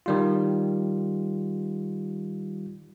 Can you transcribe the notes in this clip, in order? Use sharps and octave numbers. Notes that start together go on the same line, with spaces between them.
D#3 G3 F4